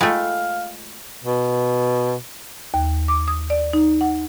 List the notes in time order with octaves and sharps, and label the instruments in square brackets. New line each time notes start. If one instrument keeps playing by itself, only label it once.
[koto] G#3 A3 [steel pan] F4 G5 B5 [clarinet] F5
[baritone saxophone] B2
[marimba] D#2
D6
D#6
D5
D#4
F#5